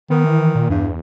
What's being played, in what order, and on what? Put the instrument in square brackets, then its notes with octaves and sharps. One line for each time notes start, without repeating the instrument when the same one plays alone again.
[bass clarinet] D#3 [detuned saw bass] B3
[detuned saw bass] E3
A#2
[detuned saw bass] E2 [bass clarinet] G2